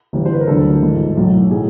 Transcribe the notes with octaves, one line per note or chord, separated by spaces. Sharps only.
G1 G2 E3 G3
C5
B4
A#4
D2 D3 F#3 A4
G#1 G#2 E3 G3
B1 A2 F#3
A2 F#3 G#4